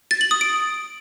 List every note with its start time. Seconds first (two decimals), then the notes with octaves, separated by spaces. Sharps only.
0.11 A6
0.21 F#7
0.31 D#6
0.41 D7